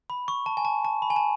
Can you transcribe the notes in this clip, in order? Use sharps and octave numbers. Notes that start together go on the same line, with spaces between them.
B5
C#6
A5
G#5
A5
A5
B5
G#5
A5